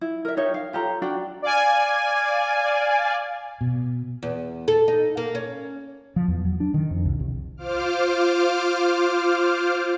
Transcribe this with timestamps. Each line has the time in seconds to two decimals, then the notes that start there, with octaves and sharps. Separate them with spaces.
0.01 E4
0.25 A#4 E5
0.37 D#4 G4 C#5 E5
0.54 F5
0.73 F4 G4 A4 A#5
1.02 D4 F#4 D5 G5
1.42 D5 F5 G#5
3.61 B2
4.23 E2
4.68 A4
4.88 D#4
5.17 A#3
5.35 C#4
6.16 F3
6.28 E2
6.45 F#3
6.60 D4
6.74 D#3
6.91 F2
7.05 C2
7.20 C2
7.57 F4 C5 F5 D6 F6